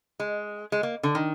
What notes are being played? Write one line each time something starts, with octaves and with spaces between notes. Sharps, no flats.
G#3
G#3
A#3
D3
D#3